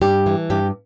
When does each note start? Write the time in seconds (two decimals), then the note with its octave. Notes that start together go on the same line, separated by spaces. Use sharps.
0.02 G2 G4
0.26 E3
0.50 G2 G4